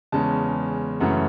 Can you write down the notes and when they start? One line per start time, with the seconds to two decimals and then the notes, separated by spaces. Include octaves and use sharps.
0.12 E2 C#3 G#3 C#4 A5
1.00 F#2 C#3 E3 A3 C#4 F#5